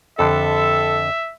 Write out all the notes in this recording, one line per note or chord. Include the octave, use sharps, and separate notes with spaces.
F2 D3 A4 E5